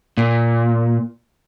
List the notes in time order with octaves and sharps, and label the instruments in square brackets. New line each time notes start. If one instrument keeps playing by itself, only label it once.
[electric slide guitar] A#2